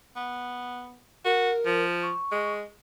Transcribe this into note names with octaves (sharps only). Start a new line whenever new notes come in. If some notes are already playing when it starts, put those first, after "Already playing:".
B3
F#4 A#4
F3
C#6
G#3